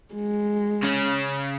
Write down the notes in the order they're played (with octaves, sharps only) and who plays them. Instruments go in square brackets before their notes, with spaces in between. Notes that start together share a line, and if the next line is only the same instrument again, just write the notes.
[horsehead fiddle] G#3
[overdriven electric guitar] C#3 C#4